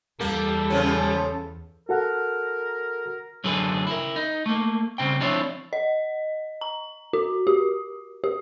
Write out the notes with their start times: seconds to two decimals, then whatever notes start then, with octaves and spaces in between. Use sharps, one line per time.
0.21 E2 G3 A#3 A4
0.70 C#3 F3 C#4
1.89 F#4 A4 A#4 F#5
3.44 F#2 D3 F#3 G#4 A4 B4
3.87 E4 A#4
4.16 D#4
4.46 A3 A#3
4.98 C2 C#3 C4 G5
5.21 F3 C4 D4 E4 F4 C#5
5.73 D#5
6.61 A#5
7.13 F#4
7.47 G4
8.24 G4